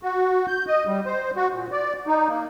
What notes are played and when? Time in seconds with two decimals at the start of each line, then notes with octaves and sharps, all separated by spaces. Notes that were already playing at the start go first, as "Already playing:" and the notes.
0.03 F#4
0.48 G6
0.67 D#5
0.87 G3
1.05 C5
1.36 F#4
1.53 A#2
1.72 D5
2.07 D#4
2.29 A#3